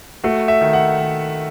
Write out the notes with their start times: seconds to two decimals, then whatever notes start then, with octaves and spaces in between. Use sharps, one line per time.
0.24 A3 F#4
0.48 E5
0.61 D#3
0.73 F#5
0.99 D#3